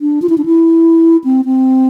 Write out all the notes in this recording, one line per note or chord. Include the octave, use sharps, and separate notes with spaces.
D4
F4
E4
D4
E4
C4
C4